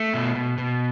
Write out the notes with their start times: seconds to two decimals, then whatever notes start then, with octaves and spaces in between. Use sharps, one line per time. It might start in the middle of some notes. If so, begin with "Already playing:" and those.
Already playing: A3
0.14 B2
0.35 B2
0.58 B2